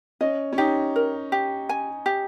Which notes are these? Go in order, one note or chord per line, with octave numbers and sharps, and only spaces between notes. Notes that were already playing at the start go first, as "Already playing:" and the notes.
C#4 D#5
C#4
D#4 G4
A#4
G4
G#5
G4